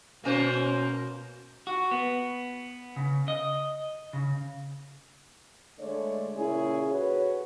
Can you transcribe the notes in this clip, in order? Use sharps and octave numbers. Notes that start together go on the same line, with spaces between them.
B2 A#3 C#4 C5
F#4
B3
C#3
D#5
C#3
D3 G#3 A3 C#5 D5
A#2 C#3 C#4 E4 G#4
F#4 A4 B4 C#5